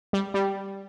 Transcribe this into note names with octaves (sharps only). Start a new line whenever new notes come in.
G3
G3